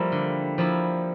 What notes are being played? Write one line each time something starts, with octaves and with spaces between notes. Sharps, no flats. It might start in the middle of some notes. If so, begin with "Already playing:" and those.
Already playing: F3 G3 A#3 E4
D3
F3 A#3 E4